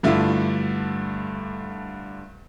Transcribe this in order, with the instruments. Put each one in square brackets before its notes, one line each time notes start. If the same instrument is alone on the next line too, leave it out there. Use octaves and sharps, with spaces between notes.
[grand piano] G2 D3 A3 E4 F4